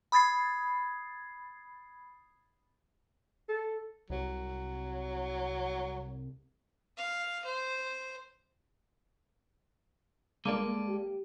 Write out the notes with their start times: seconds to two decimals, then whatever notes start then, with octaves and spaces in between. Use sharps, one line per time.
0.12 B5 D#6 G#6 A6 C7
3.49 A4
4.10 C2 F#3
6.97 F5
7.45 C5
10.45 G1 G#3 A#3 A4 D5
10.88 G4